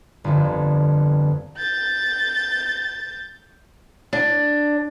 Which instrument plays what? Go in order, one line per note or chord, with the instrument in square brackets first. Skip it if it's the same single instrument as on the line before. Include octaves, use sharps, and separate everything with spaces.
[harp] G1 F2
[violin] G6 A6
[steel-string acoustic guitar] D4